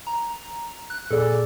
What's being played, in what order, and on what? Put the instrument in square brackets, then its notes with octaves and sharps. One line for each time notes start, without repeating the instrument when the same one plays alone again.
[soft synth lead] A#5
F#6
[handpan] A#2 G#4 D5 [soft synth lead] A4